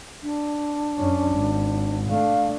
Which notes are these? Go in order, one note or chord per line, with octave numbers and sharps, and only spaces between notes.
D4
F#2 C#4
G#1
A3 D4 F5